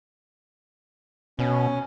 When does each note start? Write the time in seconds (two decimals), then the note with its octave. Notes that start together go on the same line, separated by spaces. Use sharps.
1.39 B2 C#4